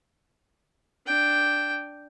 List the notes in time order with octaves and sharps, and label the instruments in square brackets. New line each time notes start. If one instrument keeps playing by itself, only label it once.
[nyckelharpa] D4 G5